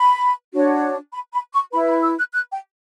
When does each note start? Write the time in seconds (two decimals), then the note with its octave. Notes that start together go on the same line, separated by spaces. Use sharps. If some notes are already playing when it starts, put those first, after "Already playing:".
Already playing: B5
0.53 D4 F#4 C#5
1.12 B5
1.32 B5
1.52 C#6
1.72 E4 B4 B5
1.87 B5
2.02 E6
2.18 F#6
2.32 F#6
2.51 G5